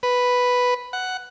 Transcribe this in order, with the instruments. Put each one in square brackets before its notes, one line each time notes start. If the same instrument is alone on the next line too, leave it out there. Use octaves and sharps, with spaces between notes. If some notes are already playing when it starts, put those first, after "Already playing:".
[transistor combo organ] B4
F#5